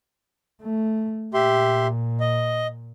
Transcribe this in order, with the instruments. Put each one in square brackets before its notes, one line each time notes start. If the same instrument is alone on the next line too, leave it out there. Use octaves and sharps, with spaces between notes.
[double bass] A3
[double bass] A#2 [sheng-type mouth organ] G4 E5 C6
[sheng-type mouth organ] D#5